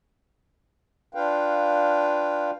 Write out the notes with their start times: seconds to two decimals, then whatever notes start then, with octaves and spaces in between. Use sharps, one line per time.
1.15 D4 F4 B4 F5 G5